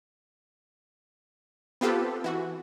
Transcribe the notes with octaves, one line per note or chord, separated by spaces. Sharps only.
B3 C4 F4 G4 A4 B4
E3 F#4